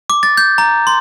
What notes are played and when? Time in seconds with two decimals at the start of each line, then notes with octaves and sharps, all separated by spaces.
0.10 D6
0.23 A6
0.37 G6
0.58 A#5
0.87 C6